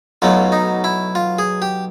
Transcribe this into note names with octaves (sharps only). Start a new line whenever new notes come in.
B1 B2 F#3 A3 F4
D#4
E4
F4
G#4
G4